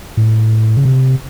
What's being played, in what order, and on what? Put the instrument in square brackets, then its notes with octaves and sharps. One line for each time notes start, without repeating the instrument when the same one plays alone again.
[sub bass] A2
C#3
C3